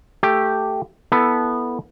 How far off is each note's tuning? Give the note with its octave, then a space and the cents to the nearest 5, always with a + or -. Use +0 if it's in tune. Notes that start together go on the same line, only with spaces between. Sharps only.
A3 +0 G4 +0
B3 -5 E4 +0 A4 +0